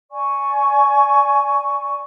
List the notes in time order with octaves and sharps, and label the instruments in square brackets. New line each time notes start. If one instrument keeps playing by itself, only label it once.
[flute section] D5 G#5 C#6